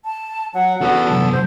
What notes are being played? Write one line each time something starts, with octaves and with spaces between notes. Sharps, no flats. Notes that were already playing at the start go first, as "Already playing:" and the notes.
A5
F#3 F#5
E2 B3 C#4 D4 F#4 A4
C2 F#2 A5
C5